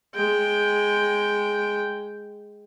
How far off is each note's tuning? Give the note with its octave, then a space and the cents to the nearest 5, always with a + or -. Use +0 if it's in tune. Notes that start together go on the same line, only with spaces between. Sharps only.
G#3 +0 G5 +0